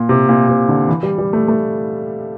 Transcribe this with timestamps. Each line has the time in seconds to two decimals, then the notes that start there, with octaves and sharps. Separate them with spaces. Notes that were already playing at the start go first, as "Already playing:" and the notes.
Already playing: A#2
0.09 C3
0.29 A#2
0.48 C3
0.68 D3
0.88 E3
1.03 G3
1.18 G3
1.33 A3
1.48 A3